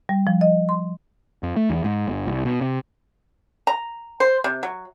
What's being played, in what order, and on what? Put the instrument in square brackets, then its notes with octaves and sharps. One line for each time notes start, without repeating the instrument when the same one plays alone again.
[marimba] G3
F3
D#5
C6
[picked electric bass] F2
A3
E2
G#2
G1
C2
B2
C3
[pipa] A#5
C5
C3
F#3